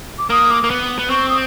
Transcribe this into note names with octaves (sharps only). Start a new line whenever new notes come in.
D6
A#3 D#6
D6
A#3
B3
B3
C4 C#6
D#6